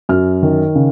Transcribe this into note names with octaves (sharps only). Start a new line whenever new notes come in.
F#2 F6
D#3
C#3